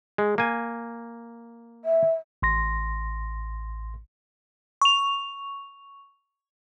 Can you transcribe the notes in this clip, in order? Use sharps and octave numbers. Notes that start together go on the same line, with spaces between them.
G#3
A#3 G#5
E5
A1 C6 A#6
C#6 F7